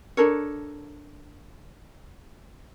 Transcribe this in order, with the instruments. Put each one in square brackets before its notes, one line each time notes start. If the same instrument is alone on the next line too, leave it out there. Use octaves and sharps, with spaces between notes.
[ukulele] D4 A4 A#4 C#5